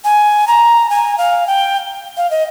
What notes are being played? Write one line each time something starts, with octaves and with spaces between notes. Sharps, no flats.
G#5
A#5
G#5
F5
G5
F5
D#5